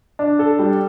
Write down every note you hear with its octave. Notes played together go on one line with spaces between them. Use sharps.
D4
A4
G3